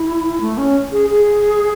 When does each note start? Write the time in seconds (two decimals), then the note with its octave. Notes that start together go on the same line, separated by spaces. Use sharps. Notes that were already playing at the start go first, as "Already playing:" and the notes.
Already playing: E4
0.41 A3
0.58 C#4
0.92 G#4
1.10 G#4